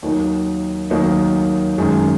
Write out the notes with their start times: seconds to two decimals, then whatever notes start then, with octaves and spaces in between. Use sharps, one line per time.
0.02 D#2 D#3 F#3 A#3 D#4
0.90 D#2 D#3 F#3 A#3 D#4
1.78 F#2 D#3 G#3